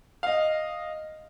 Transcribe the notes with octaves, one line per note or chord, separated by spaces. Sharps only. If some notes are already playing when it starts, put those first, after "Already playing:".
D#5 F5